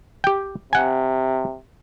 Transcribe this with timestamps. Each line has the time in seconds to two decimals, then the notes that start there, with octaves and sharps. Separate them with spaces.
0.24 G4 G5
0.73 C3 F#5 G#5